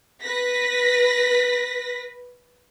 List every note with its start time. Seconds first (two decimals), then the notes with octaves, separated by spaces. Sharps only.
0.22 B4 A#6 B6